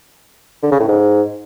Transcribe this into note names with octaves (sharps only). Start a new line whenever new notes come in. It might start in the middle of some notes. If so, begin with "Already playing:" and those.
D3
C#3
A2
G#2